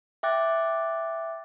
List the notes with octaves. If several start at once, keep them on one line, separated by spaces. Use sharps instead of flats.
E5 G5 D6 F#6 A6